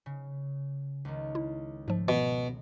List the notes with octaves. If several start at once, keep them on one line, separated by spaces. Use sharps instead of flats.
C#3
C#2 D#3
E4
G#2 F3 A3
B2